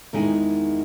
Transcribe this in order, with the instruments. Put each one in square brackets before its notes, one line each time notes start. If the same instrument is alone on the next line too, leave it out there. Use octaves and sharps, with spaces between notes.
[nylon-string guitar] E2 D#3 G#3 D#4 G#4